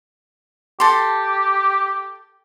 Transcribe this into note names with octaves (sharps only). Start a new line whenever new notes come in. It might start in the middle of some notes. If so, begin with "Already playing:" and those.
G4 A4 C6